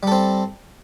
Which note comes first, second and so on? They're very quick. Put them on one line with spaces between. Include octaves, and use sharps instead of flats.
G3 A4 C4